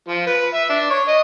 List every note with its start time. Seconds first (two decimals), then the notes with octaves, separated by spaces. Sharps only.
0.08 F3
0.27 B4
0.54 E5
0.70 D4
0.91 C#5
1.08 D#5